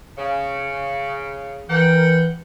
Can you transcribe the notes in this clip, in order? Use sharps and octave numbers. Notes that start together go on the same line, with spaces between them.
C#3
E3 A#4 F#5 G5